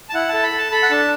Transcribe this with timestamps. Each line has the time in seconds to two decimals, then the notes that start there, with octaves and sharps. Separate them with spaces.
0.09 A5
0.14 E4 F#5
0.29 A4 A5
0.43 B5
0.52 A4
0.58 A5
0.72 A4 B5
0.83 F#5
0.91 D4 A5